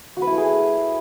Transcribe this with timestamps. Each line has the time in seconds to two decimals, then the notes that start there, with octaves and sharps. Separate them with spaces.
0.17 F#4
0.22 B4
0.27 E4
0.32 A3
0.37 G#4